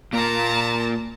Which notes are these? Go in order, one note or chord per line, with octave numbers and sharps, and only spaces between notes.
A#2 A#3 A5 A#5